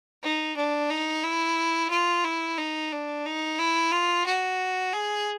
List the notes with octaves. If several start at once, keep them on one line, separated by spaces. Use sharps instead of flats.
D#4
D4
D#4
E4
F4
E4
D#4
D4
D#4
E4
F4
F#4
G#4